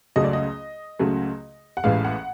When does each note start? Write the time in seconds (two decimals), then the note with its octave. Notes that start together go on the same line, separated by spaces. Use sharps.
0.16 C#2 C#3 F#3 A3 D#5
0.24 D5
0.33 D#5
0.99 C#2 C#3 F#3 A3
1.77 F#5
1.84 A1 A2 E3 G#3 F5
2.05 F#5